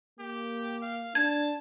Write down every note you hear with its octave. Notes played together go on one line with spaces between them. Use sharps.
A#3 G4
F5
D4 A5 G#6